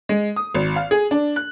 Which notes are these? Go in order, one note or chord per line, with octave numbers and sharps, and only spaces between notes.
G#3
D#6
G#1
F5
G#4
D4
F#6